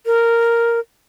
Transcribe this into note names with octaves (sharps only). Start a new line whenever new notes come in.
A#4